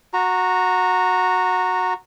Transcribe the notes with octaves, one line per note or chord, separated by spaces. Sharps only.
F#4 A#5